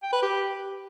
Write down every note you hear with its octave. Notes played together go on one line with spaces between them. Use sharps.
G5
B4
G4